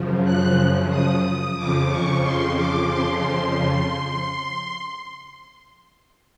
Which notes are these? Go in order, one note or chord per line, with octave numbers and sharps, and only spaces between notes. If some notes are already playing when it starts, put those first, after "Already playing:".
Already playing: F#2 C#3 F3
F#6
D#6
F2 C#3 F3 D6
C#6
C6
D6
C6